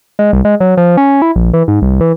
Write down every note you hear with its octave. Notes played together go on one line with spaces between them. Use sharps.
G#3
C2
G#3
F#3
F3
C#4
E4
A#1
E3
G#2
C2
E3